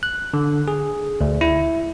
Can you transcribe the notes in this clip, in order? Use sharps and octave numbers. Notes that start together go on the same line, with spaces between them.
F#6
D3
G#4
D2
E4